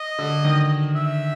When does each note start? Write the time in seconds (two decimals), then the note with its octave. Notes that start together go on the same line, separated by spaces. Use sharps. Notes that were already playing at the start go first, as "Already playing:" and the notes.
Already playing: D#5
0.19 D3
0.45 D#3
0.96 E5